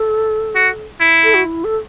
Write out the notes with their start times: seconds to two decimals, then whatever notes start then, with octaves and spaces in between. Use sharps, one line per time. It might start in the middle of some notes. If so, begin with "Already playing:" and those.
Already playing: A4
0.55 F#4
1.01 E4
1.24 A4
1.34 F#4
1.45 E4
1.64 A4